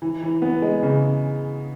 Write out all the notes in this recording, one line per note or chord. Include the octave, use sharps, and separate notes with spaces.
E3
E3
B3
G#3
C#3